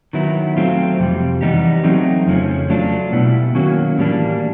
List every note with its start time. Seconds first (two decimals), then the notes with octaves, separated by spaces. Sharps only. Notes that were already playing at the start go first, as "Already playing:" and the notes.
0.13 D#3 F#3 B3 E4
0.57 F#3 A3 C4 F4
0.99 F2 C3 G3
1.41 E3 G3 B3 D#4 G4
1.84 F#3 A3 C4 D#4
2.26 F2 C#3 F3 A3 C#4
2.70 F#3 A3 D4 F4
3.12 B2 G3 B3 E4
3.54 D#3 F#3 A#3 C#4 F#4
3.97 A2 E3 G3 A#3 D4